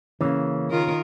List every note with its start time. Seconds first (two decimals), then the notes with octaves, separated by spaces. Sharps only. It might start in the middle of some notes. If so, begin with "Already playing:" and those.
0.21 C#3 E3 A#3
0.71 D#3 F4 A#4